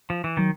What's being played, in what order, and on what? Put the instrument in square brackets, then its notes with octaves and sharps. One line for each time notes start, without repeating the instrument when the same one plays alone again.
[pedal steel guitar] F3
E3
[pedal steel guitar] D#3 [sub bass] F#3